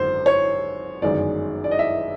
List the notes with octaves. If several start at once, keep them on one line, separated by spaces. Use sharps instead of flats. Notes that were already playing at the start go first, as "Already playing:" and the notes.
Already playing: G#1 F#2 D3 C5
C#5
G1 F#2 D#3 G#3 D5
D5
D#5
E5